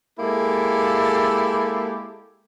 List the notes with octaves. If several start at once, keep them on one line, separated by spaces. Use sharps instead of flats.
G#3 A#3 E4 G4 A4